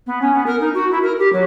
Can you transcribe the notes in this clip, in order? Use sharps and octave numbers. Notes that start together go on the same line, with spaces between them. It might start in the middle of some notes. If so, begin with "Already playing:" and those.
B3
C#4
B3
A#4
D#4
F#4
E4
A#4
G4
F#3